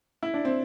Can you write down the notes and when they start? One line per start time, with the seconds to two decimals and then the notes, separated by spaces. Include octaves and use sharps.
0.23 E4
0.34 D4
0.45 C4